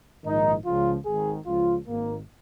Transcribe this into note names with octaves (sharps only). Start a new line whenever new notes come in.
A#1 G#2 D#3 D#4
C#2 C#3 F3 F4
G#1 G#2 D#3 G#4
C#2 C#3 F3 F4
G#1 G#2 D#3 A#3